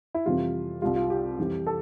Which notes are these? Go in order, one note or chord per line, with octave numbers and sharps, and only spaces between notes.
E4
F2 C3 E3 G3 F4
C2 C3 G3 F4
F4
G4
F2 E3 G3
A4